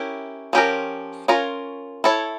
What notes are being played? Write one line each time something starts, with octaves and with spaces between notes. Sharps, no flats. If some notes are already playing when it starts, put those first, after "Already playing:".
Already playing: C#4 E4 G4 A#4
F3 C#4 G4 A#4
C#4 F4 A#4 C#5
E4 A4 C#5